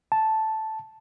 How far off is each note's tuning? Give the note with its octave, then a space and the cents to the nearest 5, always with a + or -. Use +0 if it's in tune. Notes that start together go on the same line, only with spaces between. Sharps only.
A5 -5